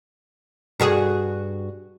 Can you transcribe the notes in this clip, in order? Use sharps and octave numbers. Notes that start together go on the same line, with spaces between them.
G2 F#4 G#4